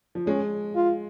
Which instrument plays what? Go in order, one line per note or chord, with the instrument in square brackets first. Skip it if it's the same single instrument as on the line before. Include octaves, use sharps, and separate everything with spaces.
[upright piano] F3
[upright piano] G#3 [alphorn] C#4
[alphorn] F4